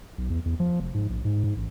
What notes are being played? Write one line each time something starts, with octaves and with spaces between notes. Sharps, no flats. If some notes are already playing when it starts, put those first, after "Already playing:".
B1
E2
E2
F3
F1
G#2
A#1
G#2
G#2
A1